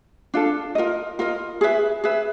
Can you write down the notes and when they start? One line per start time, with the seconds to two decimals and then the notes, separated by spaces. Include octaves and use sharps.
0.34 D4 F4 A4
0.75 F4 A#4 D#5
1.19 F4 A#4 D#5
1.61 G#4 B4 E5
2.04 G#4 B4 E5